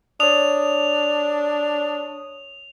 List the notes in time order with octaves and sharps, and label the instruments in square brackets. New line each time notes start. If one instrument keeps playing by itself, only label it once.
[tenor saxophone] D4 [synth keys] C#5 D#6 [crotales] F7